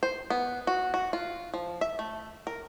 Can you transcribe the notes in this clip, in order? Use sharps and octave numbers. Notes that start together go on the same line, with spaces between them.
C5
B3
F#4
F#4
F4
F3
E5
A3
A#4